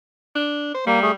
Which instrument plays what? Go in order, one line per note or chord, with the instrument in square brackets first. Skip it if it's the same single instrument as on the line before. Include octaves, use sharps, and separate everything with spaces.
[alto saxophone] D4
C5
[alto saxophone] G3 [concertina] A#3
[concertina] A3 G#4